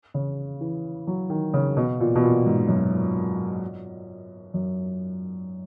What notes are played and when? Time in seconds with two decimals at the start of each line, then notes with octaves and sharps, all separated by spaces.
0.14 C#3
0.61 E3
1.07 F#3
1.30 D#3
1.54 C#3
1.77 B2
2.00 A#2
2.15 B2
2.23 A#2
2.46 G#2
2.69 F#2
4.54 F#2